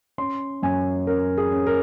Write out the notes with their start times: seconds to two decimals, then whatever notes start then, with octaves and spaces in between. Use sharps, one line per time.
0.18 C#4 C6
0.63 F#2 G#5
1.07 C#4 A#4
1.38 G#4
1.52 C#4
1.67 A#4